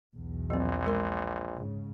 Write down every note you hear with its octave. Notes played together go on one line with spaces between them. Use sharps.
B1 E2
A#1 F#3 C4
G#3 A#4 C6
G#2 C#3